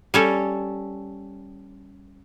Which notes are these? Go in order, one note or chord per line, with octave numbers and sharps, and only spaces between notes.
G3 C#4 A4